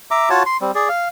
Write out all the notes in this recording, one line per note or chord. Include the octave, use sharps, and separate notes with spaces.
E5 A#5 D6
F4 F#4 C#5 A5
C6
G3 C4
G#4 D5
F5